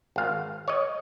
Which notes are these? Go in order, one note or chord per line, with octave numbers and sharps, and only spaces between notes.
G#1 F5
C#5 D#5